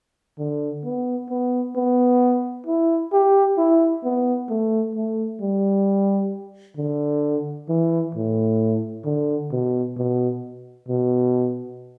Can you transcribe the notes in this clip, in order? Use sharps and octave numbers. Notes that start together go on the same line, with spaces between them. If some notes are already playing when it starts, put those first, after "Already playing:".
D3
B3
B3
B3
E4
G4
E4
B3
A3
A3
G3
D3
E3
A2
D3
B2
B2
B2